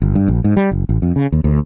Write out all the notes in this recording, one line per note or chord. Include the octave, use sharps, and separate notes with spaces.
G1
G2
A#1
G#2
G3
F#1
A1
F2
C#3
D#2
D2